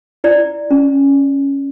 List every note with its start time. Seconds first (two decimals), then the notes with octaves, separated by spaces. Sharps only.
0.24 E4 D5
0.71 C#4